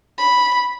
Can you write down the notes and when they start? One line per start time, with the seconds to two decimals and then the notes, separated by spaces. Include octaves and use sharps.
0.18 B5